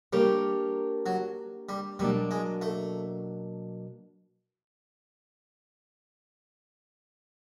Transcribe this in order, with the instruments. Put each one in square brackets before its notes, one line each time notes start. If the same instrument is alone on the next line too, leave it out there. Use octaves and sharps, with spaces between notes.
[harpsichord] G3 [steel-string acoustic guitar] A#3 D4 G4 A#4 C#5
[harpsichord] F#3
G3
[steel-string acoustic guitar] B2 F#3 A#3 D4 [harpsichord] G3
[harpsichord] G#3
A3